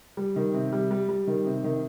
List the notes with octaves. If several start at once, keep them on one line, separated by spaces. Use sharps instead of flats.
G3
D#3
C3
G3
G3
G3
D#3
C3
D#3